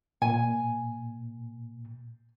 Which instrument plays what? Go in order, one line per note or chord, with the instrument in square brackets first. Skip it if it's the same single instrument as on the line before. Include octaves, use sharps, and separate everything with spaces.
[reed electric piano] A#2 [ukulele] G#5